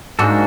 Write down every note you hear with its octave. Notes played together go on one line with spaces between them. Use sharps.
G#2 A#3 D4 F#4 A4